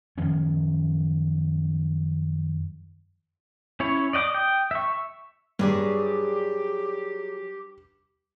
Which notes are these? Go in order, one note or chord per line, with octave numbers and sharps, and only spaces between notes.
F#2 D#3 F3 C#4
C#4 E4 C#5
D5 D#5 F#5 D6 D#6
G5 D#6
E5 C#6
G2 F#3 G4 G#4 D5